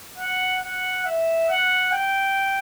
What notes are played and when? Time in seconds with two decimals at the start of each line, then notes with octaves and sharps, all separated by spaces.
0.18 F#5
0.63 F#5
1.05 E5
1.49 F#5
1.92 G5